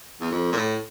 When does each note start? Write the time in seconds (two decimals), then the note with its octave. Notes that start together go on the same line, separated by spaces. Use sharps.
0.21 E2
0.31 F2
0.52 A#2
0.57 A2